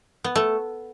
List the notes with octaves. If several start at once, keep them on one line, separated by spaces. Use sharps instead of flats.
B3
A3